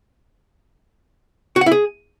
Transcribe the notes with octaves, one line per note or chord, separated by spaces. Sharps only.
F#4
F#5
E4
G#4